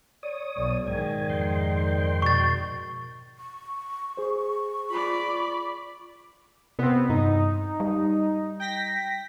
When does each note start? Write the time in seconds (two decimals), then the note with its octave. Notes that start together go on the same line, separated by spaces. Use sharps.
0.23 C#5 D5 D#6
0.56 B1 D5
0.87 G#2 D#3 G#5
1.29 F2 G5 C6
2.22 B2 C#6 A6
3.38 C#6
4.17 G#4 C5
4.90 F4 D5 B5
6.79 C3 B3 C4
7.10 G2 D#4
7.80 G3
8.60 G5 A#6 B6